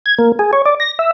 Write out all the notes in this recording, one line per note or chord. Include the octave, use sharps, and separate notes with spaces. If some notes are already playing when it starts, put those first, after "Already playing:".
G#6
A#3
G#4
C#5
D5
A#6
E5